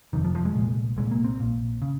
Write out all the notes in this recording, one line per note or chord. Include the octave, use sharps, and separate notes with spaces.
F#1 F2 C3 D#3
F3
F3
G#3
C2 A#2
C2 A#2 G#3
A#3
C4
A#1 A#2
C#3